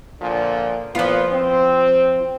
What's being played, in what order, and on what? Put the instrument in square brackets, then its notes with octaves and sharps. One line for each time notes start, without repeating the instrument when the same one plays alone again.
[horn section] A#2 D3 F3
[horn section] A#2 B3 [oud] F3 F4
[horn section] C4